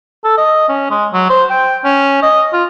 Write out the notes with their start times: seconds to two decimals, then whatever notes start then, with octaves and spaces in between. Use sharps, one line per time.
0.24 A4
0.38 D#5
0.69 C#4
0.91 G#3
1.14 F#3
1.30 C5
1.50 G5
1.85 C#4
2.22 D#5
2.53 F4